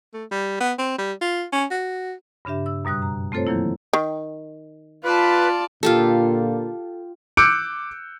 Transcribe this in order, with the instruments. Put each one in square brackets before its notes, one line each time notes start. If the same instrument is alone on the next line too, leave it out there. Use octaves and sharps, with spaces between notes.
[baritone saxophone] A3
G3
B3
C4
G3
F4
C#4
F#4
[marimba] G2 C#3 D4 G4 E5
E6
F#2 B2 G3 D#6 F#6
A#5
A3 C4 F4 A4 C5 C#5
D#3 E3 F#3 A#3 E4
[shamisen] D#3
[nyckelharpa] F4 [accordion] B4 [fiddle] D5 A5
[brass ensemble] A#2 D3 A#3 [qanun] F4 G4 A4
[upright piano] D6 E6 F#6 G6 C#7 D7